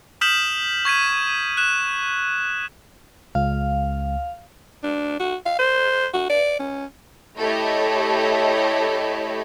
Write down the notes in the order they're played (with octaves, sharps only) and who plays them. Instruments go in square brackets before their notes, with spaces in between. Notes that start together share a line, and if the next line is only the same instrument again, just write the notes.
[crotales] D#6 F6 G6 B6 E7 F#7
C#6 G#6 B6 D#7
F#6 E7
[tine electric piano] C#2 [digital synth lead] F5
[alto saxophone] D4
F#4
F5
C5
F#4
D5
C#4
[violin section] A3 E4 G4 A4 C#5 D#5